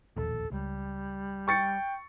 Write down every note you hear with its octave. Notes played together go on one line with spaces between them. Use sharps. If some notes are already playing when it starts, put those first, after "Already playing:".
E1 A#1 D#2 A4
C#2 G3
G5 C#6 A6 C#7